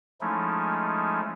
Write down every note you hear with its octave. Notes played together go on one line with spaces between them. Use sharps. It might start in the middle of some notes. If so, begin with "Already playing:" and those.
F3 G#3 A3 C#4 D#4 E4